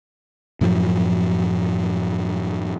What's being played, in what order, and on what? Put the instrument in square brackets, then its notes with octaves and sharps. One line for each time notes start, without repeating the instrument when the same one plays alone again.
[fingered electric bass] F#2 A2 F3 F#3